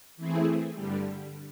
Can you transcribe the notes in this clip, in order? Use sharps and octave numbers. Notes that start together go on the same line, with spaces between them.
E3 A3 C4 E4 G#4
G2 D3 G3